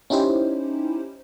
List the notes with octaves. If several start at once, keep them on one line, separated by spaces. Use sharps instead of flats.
C#4 D#4 E4 G4 C5